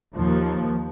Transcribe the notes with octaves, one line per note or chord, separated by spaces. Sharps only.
D#2 F3